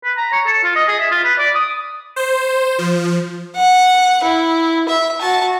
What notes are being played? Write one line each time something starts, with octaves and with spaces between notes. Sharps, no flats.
B4
A#5
C#5
A4
F4
D#5
G#4
E5
F4
B4
D5
D#6
C5
F3
F#5
E4
E5
F#4 A5